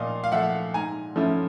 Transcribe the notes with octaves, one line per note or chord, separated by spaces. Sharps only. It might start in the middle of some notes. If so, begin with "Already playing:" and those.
Already playing: A#2 F3 D#5 F5
F5
F3 A3 E5 F#5
G#2 G#5 A#5
F3 A3 C#4 E4